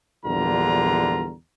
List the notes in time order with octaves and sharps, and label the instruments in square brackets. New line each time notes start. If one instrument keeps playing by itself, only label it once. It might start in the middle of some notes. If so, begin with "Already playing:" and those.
[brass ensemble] A#1 E2 D3 G3 F4 A#5